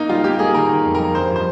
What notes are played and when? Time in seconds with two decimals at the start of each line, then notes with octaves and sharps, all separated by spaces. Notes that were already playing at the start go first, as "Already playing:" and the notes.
Already playing: A#3 D#4
0.09 G3 F4
0.24 A#3 G4
0.39 A#3 G#4
0.54 D#3 A#4
0.69 D#3
0.85 F2
0.95 G3 A#4
1.15 G2 C5
1.30 F3
1.36 C5